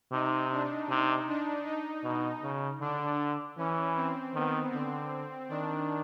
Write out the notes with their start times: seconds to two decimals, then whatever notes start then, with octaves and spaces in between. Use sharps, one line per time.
0.12 C3 D#4
0.51 D4
0.90 C3 D#4
1.28 D4
1.66 D#4
2.04 B2
2.43 C#3
2.81 D3 D4
3.57 E3 C#4
3.96 C4
4.34 D#3 B3
4.73 D3 C4
5.49 D#3 D4